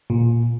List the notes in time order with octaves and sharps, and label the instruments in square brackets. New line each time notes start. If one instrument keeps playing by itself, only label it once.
[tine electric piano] A#2